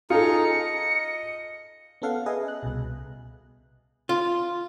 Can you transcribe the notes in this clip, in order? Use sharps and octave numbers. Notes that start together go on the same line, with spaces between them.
D#4 F4 G#4 A4 C#7
D#5
B3 C#4 A4 F5 F#5
G#4 B4 D#5 E5 G#5
F#6
C2 B2
F4